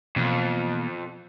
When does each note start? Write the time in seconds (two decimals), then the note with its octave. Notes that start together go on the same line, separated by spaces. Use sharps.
0.16 F2 B2 E3 A#3